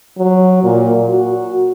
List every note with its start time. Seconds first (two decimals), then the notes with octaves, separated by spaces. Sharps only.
0.18 F#3
0.63 A#2
1.09 F#4